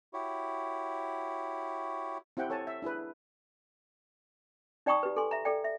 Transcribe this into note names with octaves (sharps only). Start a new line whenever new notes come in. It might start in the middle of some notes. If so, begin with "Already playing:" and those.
E4 F#4 G4 C#5
C4 E4 G4 F#5 G5
A4 C#5 G#5 A5
E5
D4 E4 G#4 B4
D#4 D5 G5 A#5 C#6 D#6
G4 B4
A4 G#5 C6
E5 A#5
A4 D5 G5
E5